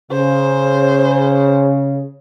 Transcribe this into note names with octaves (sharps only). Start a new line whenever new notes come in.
C#3 C5